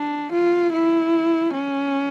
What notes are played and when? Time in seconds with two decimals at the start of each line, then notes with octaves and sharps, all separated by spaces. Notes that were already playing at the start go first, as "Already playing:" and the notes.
Already playing: D4
0.34 F4
0.74 E4
1.54 C#4